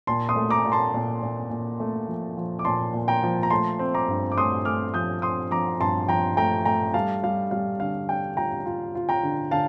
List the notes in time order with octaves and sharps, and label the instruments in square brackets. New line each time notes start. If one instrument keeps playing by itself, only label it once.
[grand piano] A#2 A5 C6
C6 D#6
A3
A#5 D6
A#2
A5 C6
A#2
A#2
A#2
A3
F3
F3
D6
A#2 A5 C6
A#2
G5 A#5
F3
A#5
A3 A5 C6
C4
A#5 D6
G2
D6
A3 C6 D#6
A3 D6 F6
F3 D#6 G6
C4 C6 D#6
F3 A#5 D6
G2 A5 C6
F3 G5 A#5
A3 G5 A#5
A3 G5 A#5
G3 F5 A5
G3 F5
G3 F5
D3 F5
D4 G5
F4 G5 A#5
F4
F4
G5 A#5
D3
D3 F5 A5